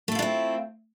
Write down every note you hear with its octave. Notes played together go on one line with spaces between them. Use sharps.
A3 C4 D4 E4 F4